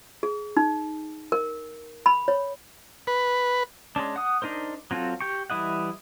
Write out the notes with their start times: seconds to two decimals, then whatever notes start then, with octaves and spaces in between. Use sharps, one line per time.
0.23 G#4
0.57 D#4
1.32 A#4
2.06 B5
2.28 C#5
3.07 B4
3.96 G#3 C#4 D4
4.16 F#5 D#6
4.42 D4 D#4 A#4 C5
4.91 F#3 C4 F4 A4
5.21 G4 G5 C#6
5.50 E3 G3 E4 D#5 F#5